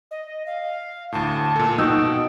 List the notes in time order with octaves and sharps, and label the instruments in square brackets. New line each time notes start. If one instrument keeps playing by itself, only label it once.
[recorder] D#5
F5
[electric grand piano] D2 A2 [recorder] A5
[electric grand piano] A#2 A4
[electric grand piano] B2 [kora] D#4 F#4 [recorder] G5 [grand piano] E6